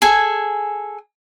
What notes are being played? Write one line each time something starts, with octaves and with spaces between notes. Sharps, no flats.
G#4 A4 G#5